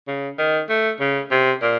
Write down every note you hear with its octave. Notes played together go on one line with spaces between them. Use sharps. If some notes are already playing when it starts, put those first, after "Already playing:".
C#3
D#3
A3
C#3
C3
A#2